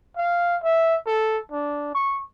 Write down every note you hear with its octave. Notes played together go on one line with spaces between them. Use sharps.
F5
E5
A4
D4
C#6